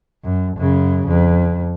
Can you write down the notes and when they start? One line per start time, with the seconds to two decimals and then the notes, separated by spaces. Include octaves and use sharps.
0.24 F#2
0.57 F#2 C#3
1.07 F2